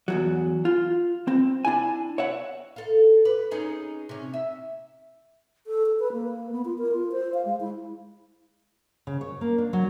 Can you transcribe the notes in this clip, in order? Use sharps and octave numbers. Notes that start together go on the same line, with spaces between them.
E2 G2 F#3
F4
C4
D4 E4 G#5
C#5 E5 F#5
A4 F5
B4
C#4 D#4 G#4
C3 C#4
E5
A4
A4
B4
A#3
B3
F4
A#4
F4
C5
F5
G#3
E4
C#3
C#5
A#3
D4
F#3